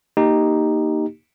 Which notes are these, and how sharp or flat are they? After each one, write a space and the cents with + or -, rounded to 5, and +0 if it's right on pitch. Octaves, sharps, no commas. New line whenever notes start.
A#3 +0 D#4 +0 G4 +0